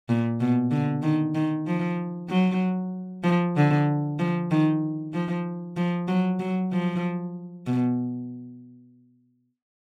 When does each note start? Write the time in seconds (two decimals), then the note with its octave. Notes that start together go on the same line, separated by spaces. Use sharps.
0.09 A#2
0.40 B2
0.71 D3
1.03 D#3
1.35 D#3
1.67 F3
2.29 F#3
3.24 F3
3.56 D3
4.19 F3
4.51 D#3
5.13 F3
5.77 F3
6.08 F#3
6.40 F#3
6.72 F3
7.67 B2